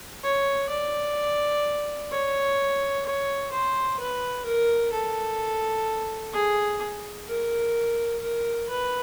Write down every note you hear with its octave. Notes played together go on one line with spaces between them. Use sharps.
C#5
D5
C#5
C#5
C5
B4
A#4
A4
G#4
A#4
A#4
B4